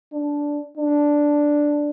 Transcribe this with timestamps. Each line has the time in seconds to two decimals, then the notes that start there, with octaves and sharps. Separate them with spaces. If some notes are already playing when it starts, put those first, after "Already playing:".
0.12 D4
0.77 D4